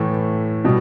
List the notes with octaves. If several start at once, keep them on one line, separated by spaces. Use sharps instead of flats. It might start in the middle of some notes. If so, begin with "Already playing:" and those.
Already playing: A2 E3 A3
B2 G3